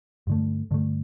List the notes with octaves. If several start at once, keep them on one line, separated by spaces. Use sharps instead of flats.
G2 D3 A3
G2 D3 A3